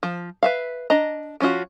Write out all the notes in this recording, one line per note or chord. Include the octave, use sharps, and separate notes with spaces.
F3
B4 E5 F5
D4 D#5 A#5
F3 C#4 D4 F4 F#4